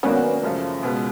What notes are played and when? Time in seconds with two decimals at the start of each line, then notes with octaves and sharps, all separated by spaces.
0.03 D#3 F#3 A#3 B3 C#4 D4 F#4
0.43 F#2 C#3 F3 A3
0.83 C#2 B2 G#3 B3